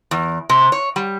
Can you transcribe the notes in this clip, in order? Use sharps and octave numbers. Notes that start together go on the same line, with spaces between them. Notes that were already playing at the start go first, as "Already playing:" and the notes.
E2
C3
C#5
G3